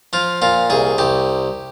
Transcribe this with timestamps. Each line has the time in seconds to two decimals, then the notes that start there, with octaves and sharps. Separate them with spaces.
0.13 F3 F4
0.42 A#2 F4
0.70 C2 G#4
0.98 C2 G4